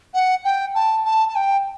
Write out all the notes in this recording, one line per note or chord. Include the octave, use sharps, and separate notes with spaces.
F#5
G5
A5
A5
A5
G5